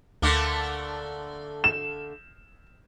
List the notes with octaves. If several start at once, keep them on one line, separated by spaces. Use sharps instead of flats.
D2 D3 A3 A#3 D6
E7